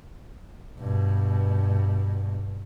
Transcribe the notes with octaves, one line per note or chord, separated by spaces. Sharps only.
G2 B2